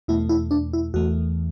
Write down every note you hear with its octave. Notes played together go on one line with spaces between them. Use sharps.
E2 B2 A3 E4
E4
D4
E4
E2 E3 A3 F#4